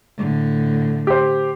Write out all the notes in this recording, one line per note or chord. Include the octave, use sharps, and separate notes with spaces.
A2 D3
G4 C5